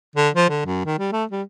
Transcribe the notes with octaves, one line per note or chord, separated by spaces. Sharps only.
D3
F3
D3
F#2
D#3
G3
A3
G3